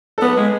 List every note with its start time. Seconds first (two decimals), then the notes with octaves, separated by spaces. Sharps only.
0.18 A4
0.22 B3 B4
0.37 G#3